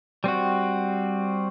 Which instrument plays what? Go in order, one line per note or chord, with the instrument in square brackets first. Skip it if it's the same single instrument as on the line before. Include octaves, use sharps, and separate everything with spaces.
[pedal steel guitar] G3 C4 F#4